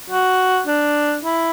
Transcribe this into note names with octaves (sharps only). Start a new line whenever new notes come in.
F#4
D4
E4